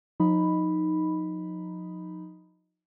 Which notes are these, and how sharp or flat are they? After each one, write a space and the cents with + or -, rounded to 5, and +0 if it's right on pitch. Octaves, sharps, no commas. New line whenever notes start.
F3 +35 D#4 +0 B5 +0